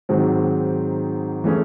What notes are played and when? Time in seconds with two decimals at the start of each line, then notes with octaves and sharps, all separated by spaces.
0.09 G#2 D#3 F#3 C4
1.44 E3 A3 C#4 G#4